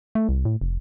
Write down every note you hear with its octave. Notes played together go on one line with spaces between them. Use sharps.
A3
C2
A2
F1